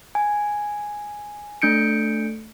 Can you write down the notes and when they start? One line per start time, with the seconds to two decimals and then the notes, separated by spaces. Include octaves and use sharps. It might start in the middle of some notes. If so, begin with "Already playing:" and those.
0.15 G#5
1.62 A3 D4 G6 C#7 D7